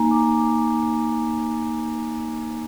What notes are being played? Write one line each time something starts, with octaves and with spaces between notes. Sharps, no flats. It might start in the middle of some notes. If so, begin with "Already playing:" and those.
Already playing: A#3 D#4 G#5 A#5
D6